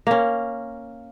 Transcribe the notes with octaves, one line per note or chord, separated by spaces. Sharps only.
A#3 C#4